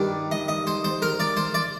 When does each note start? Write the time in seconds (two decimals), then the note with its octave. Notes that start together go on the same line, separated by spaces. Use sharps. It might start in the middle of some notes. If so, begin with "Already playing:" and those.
Already playing: G2 D#3 D5
0.32 D#5
0.48 D#5
0.67 C5
0.84 C5
1.02 A#4
1.20 D5
1.37 C5
1.54 D5